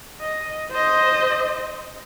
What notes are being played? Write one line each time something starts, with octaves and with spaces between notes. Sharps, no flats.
D#5
C5 D#5